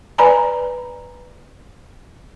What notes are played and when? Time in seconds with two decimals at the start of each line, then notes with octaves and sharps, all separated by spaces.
0.18 B4 D5 G#5 A#5 B5